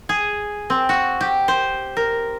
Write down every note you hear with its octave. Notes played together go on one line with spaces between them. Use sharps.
G#4
C4
F#4
G4
C5
A#4